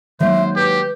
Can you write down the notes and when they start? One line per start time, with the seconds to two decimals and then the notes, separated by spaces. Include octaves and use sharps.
0.20 D#3 F#3 G#3 A#3 D#4 C5 C#5 E5
0.56 G4 B4